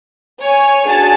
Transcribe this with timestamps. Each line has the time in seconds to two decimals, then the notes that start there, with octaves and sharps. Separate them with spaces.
0.42 C#5 G#5
0.86 D4 F#4 G#4 G#5 A5